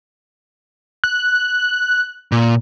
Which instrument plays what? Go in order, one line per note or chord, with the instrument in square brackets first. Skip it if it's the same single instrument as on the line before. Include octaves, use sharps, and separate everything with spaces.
[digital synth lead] F#6
[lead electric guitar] A#2